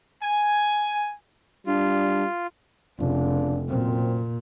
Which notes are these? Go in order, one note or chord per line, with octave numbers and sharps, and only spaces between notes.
G#5
G3 D4 F4
F1 C#3 D4 F4
F#2 A#2 C4